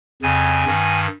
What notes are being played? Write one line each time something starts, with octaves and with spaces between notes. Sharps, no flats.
F2 C#3 G#5
G2 D#3